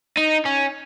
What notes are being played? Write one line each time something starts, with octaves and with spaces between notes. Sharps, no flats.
D#4
C#4